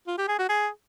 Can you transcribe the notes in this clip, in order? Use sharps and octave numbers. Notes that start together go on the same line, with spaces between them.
F4
G4
G#4
F#4
G#4